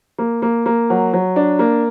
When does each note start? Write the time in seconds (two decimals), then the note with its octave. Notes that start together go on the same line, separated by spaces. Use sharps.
0.19 A#3
0.42 A#3
0.66 A#3
0.90 F#3
1.13 F#3
1.36 D4
1.59 A#3